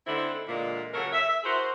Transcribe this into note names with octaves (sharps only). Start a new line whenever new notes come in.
D3 A3 C4 D#4 E4
A#2 D3 E3 G#3 A#3
C#3 F#3 C#4 A4 A#4 C#5
E5
E4 F#4 G#4 A#4 C5